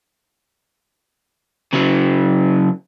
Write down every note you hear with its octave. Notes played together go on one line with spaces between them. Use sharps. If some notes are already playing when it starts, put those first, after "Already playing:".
C#3 F#3